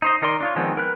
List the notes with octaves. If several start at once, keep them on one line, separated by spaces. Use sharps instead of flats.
D#4 C5 D#5
D#3 D#4 A#4 D5 C6
D4 F4 C#5
D#3 F3 G#3 B3 C4
A#4 B4 F#6